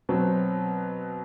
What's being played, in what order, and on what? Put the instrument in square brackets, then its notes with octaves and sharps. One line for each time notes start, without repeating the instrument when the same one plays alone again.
[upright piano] B2 F#3 C4